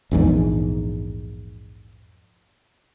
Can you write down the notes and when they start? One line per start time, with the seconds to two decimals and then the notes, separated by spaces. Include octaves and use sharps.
0.11 A#1 E2 G#2